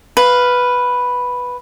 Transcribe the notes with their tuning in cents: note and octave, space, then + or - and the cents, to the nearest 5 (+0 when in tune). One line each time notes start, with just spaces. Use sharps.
B4 +0 F5 +0